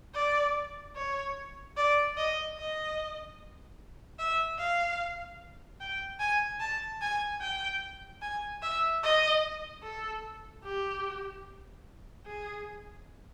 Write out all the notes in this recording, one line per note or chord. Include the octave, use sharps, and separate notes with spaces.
D5
C#5
D5
D#5
D#5
E5
F5
G5
G#5
A5
G#5
G5
G#5
E5
D#5
A4
G4
G#4